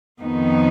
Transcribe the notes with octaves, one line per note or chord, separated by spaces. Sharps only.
F2 D#3 B3 D#4